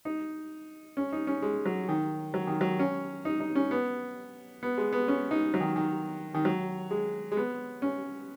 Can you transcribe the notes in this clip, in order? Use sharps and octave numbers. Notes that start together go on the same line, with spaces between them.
D#4
C#4
D#4
C#4
G#3
F#3
D#3
F#3
D#3
F#3
C#4
D#4
D#4
C#4
B3
B3
G#3
B3
C#4
D#4
F#3
D#3
D#3
D#3
F#3
G#3
G#3
B3
C#4